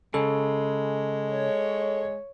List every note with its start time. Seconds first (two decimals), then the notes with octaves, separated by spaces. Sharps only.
0.14 C#3 G#3 A4
1.31 C#5